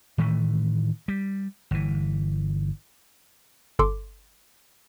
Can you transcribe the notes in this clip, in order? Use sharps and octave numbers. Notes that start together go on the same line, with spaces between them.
A2 D#3 E3 A3
G3
G1 E3
G1 A4 C6 D6